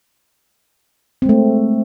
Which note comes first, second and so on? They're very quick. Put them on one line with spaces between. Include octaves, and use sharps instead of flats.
C4 G#3 A3